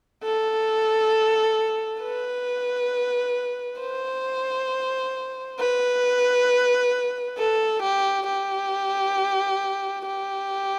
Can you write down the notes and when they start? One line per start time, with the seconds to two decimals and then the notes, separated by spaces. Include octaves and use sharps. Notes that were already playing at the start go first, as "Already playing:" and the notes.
0.23 A4
2.02 B4
3.80 C5
5.59 B4
7.38 A4
7.82 G4
8.27 G4
10.06 G4